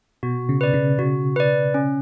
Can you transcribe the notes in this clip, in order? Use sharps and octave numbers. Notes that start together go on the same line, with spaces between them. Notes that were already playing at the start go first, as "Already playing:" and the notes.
B2 F#4
C#3
B4 D5
C#3
C#3 F#4
B4 D5
C#4